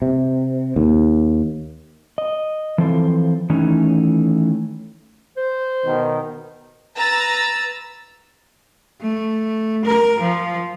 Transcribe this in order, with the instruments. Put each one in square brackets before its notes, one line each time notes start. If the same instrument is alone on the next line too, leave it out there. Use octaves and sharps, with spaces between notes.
[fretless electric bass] C3
D#2
[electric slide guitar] D#5
E3 F3 C4 A4 C5
D#3 E3 A3 C#4 D#4
[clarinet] C5
[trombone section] B2 D#3
[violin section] B4 A#5 E6 A6
[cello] A3
A#4
F3